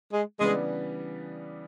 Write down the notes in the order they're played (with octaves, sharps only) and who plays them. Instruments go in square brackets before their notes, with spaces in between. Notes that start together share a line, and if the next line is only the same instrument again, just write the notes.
[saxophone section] G#3
[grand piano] C#3 E3 G3 B3 D4 [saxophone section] G#3